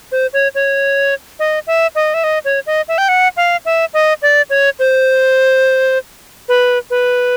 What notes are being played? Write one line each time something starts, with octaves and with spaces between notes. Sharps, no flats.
C5
C#5
C#5
D#5
E5
D#5
E5
D#5
C#5
D#5
E5
G5
F#5
F5
E5
D#5
D5
C#5
C5
B4
B4